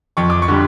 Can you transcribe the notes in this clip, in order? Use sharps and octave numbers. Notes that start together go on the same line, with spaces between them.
F2 C#6
D6
C#6
D3 G3